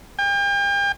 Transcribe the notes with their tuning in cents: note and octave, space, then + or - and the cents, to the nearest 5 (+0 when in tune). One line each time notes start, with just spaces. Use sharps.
G5 +40